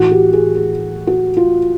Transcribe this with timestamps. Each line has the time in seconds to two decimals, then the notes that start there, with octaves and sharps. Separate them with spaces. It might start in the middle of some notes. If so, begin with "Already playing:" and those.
Already playing: A2 E3 F#4
0.11 G4
0.33 G#4
0.56 G#4
1.07 F#4
1.37 F4